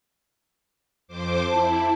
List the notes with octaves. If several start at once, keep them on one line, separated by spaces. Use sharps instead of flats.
F2 C5 D6
E4 A5